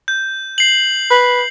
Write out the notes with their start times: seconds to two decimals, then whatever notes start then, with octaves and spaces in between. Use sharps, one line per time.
0.08 G6
0.58 C7 F#7
1.11 B4